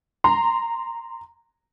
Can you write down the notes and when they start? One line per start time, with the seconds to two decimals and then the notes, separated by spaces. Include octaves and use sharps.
0.24 A#5 C6